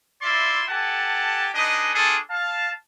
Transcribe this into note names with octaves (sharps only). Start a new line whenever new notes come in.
E4 F4 D5 E5 C6
G4 A4 F#5 G#5 A5
D4 D#4 G#4 B4 D#5
D4 F4 G#4 A4
F5 A5